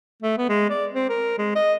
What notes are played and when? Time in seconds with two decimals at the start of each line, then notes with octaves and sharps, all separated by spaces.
0.22 A3
0.38 B3
0.49 G#3
0.70 D5
0.94 C4
1.09 A#4
1.38 G#3
1.56 D#5